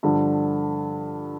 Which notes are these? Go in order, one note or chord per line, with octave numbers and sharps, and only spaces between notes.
G2 D3 F3